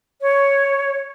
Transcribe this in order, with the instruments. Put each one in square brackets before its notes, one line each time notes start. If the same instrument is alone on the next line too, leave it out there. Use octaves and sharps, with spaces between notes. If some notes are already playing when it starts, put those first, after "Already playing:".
[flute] C#5